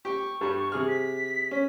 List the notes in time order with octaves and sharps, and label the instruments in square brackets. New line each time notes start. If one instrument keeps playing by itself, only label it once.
[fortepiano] G4 G5 [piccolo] C#6
[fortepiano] G2 G3
C3 G#4 F6
[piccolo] B6
[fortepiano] C#4 [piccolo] B6